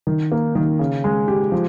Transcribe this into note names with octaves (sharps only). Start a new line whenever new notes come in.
D#3
A#3
D#3
C#3
G#3
G4
F3